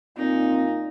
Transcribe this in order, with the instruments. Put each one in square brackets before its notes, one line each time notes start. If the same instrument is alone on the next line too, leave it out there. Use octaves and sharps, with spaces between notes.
[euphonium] A#2 [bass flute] C4 [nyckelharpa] D#4